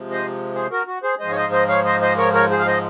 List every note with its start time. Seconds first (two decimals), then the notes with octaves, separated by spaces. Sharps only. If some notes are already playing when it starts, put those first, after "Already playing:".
Already playing: C3 F3 G#3
0.11 C5 D#5
0.55 G#4 C5
0.71 F#4 A#4
0.87 F#4
1.03 G#4 C5
1.20 G#2 F3 G#3 C5 D#5
1.31 C#5
1.36 C5 D#5
1.52 C5 D#5
1.68 C#5 F5
1.85 C5 D#5
2.02 C5 D#5
2.18 A#4 C#5
2.34 A#4 C#5
2.51 G#4 C5
2.59 F5
2.67 C5 D#5